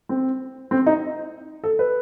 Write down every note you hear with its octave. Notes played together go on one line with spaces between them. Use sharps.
C4
C4
D#4
A4
B4